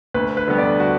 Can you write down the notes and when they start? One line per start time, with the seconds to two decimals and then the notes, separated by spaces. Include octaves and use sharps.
0.14 D2 B4
0.37 B4
0.48 D3 G3 B3
0.58 D5
0.80 F#4